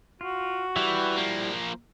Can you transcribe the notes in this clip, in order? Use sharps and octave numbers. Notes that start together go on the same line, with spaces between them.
F4 F#4
E3 G3 E4 G4
F3 A#3